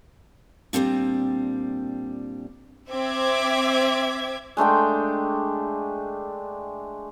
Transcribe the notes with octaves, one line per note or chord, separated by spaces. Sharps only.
A#2 F#3 G3 C4 D4
C4 E5 D6 G#6
G#3 A3 D4 G5